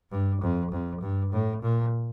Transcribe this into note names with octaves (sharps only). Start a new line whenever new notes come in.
G2
F2
F2
G2
A2
A#2